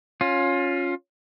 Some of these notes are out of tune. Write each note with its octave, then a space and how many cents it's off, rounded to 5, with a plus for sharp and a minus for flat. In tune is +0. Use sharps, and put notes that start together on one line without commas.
C#4 +0 F4 +20